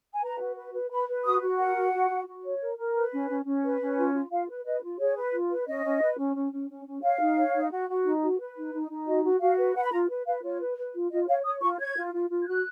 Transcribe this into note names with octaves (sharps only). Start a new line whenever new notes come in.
G#5
B4 A#5
F#4
B4
B4
B4 B5
B4
F#4 D#6
F#4
A#4 F#5
F#4
F#4
F#4
F#4
C#5
A#4
A#4
B4
C#4
C#4
C#4
B4
C#4
F4
F4
F4 F5
B4
B4 D#5
F4
G#4 C#5
B4
F4
B4
C#4 D#5
C#4
B4
C#4
C#4
C#4
C#4
C#4
C#5 F5
D#4
C#5
D#4
F#4
F#4
D#4
F#4
B4
D#4
D#4
D#4
F#4 D#5
F#4
F#4 F5
B4
B4 F#5
B5
F4 A#5
B4
B4 F5
F4 C#5
B4
B4
F4
F4 D#5
C#5 F5
C#5 D#6
F4 C#6
C#5 G#6
F4
F4
F4
G#6
F#4 F#6